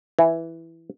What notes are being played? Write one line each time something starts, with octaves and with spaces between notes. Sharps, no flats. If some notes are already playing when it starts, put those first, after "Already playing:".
E3